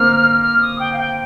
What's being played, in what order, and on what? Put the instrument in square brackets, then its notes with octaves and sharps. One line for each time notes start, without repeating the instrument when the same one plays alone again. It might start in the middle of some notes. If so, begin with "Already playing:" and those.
Already playing: [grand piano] A#3 C4 [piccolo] F6
[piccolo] F6
D#6
G5
F5
G5